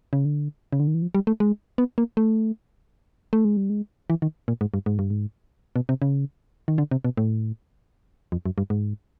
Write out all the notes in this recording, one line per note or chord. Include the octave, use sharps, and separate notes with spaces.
C#3
D3
C#3
D3
D#3
E3
F3
G3
A3
G#3
B3
A#3
A3
A3
G#3
G3
G#3
E3
D#3
A#2
G#2
G2
G#2
G2
G#2
B2
C3
C#3
D#3
D3
C3
B2
A2
F2
F#2
G2
G#2